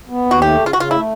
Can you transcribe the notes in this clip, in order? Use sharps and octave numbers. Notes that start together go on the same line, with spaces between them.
B3
D#2
F#4
A3 G4
C#3
F4
C#3 F#4
F4
A3 E4